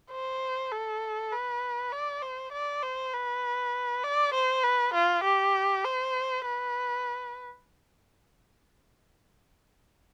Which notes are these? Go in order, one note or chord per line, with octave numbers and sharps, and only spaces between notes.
C5
A4
B4
D5
C5
D5
C5
B4
D5
C5
B4
F4
G4
C5
B4